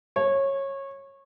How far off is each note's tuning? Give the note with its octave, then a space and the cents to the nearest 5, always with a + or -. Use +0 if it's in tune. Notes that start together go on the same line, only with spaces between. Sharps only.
C#5 -20